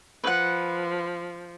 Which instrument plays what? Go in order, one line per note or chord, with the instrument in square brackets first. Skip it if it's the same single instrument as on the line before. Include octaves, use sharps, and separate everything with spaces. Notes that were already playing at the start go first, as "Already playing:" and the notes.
[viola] F3 [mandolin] B4 F#5